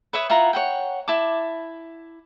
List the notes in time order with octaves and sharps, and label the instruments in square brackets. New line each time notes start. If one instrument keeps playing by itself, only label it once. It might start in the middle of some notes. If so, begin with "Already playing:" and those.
[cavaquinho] B4 C#5 E5 D#6
E4 F4 F#5 A#5
C#5 F#5 G5
E4 A5 D6